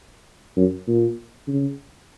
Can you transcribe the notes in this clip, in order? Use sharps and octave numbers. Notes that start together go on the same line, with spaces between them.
F#2
A#2
C#3